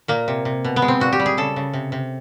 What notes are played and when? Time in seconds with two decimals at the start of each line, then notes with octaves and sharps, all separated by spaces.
0.08 A#2 A#3
0.28 C3
0.45 C3
0.64 B2
0.76 B3
0.82 G#3
0.88 C4
1.00 A#2 F#4
1.12 G4
1.20 G3
1.26 G#4
1.37 C#3 A4
1.56 C#3
1.73 C3
1.92 C3